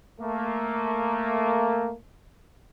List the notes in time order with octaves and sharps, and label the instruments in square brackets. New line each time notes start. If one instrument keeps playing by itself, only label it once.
[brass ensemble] A3 A#3